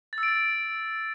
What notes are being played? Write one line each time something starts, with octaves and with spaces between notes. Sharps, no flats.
A6
E6
D7
A6